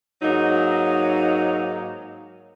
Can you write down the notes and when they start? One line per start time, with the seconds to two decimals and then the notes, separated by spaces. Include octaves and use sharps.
0.22 G#2 F#3 A#3 D#4